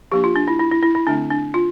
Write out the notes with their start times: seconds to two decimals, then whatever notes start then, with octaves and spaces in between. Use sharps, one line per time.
0.12 F3 A#3 D4 G4
0.24 F4
0.36 D4
0.48 E4
0.59 E4
0.72 E4
0.83 E4
0.95 E4
1.07 D3 A3 C4 D4
1.30 D4
1.54 F4